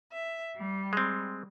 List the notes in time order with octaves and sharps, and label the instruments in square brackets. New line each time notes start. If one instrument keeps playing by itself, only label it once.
[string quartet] E5
G3
[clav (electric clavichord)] G#3 C4